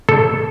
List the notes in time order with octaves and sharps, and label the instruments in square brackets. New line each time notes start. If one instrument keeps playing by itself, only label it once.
[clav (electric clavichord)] A4